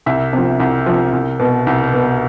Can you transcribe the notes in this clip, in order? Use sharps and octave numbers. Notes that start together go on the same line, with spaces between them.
C2 E5
C3 F3
C2
C3 F3
C2
B2
C2
B2